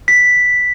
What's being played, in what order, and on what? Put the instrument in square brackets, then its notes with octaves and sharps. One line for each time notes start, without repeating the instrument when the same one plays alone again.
[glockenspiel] B6